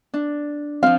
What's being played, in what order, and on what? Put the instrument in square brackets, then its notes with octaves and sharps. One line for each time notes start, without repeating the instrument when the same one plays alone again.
[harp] D4
[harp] F3 C4 [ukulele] F5